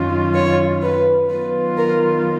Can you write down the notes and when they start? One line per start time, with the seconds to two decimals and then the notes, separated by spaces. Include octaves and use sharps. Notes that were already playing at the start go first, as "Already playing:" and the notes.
Already playing: F#2 D#3 F#3 C#4 F4
0.34 C#5
0.82 B4
1.30 D#3 F#3 B3 F4 B4
1.77 A#4